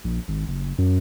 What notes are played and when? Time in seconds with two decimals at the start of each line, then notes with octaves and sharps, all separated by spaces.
0.04 A#1
0.28 G#1
0.48 F#1
0.78 F#2